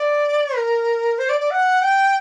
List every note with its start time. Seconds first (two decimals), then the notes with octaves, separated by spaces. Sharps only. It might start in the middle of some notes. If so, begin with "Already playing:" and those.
Already playing: D5
0.56 A#4
1.18 C5
1.29 D5
1.40 D5
1.51 F#5
1.82 G5